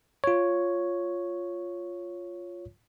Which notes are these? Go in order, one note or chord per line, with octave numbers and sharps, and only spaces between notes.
F4 C#5